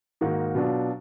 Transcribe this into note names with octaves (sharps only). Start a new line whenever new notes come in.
G#2 D#3 A#3 D#4 F#4
B2 F#3 D4 F4